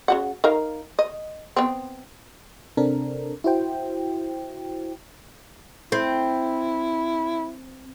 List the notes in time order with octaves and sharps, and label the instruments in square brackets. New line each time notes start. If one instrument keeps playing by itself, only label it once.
[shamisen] C#3 F#4 F#5
D#4 A#4 F5
D#5
B3 C4
[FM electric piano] C3 C4 D4 A4 A#4
E4 F#4 C5 G5
[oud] C4 [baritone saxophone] E4